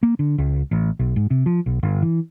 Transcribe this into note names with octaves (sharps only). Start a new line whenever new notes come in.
A#3
D3
C#2
A1
B1
G#2
C3
F3
B1
G1
E3